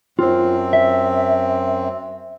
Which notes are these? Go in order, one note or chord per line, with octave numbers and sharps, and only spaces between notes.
F#2 C4 F4 C5
E5